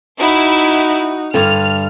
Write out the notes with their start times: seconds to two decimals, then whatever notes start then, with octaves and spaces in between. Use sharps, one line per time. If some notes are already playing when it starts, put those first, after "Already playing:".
0.19 D#4 E4 F#4
1.34 G2 D3 F6